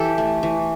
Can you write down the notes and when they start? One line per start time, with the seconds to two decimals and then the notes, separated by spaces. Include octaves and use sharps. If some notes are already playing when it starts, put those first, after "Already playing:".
Already playing: E3 G4 A4
0.18 A3
0.43 E3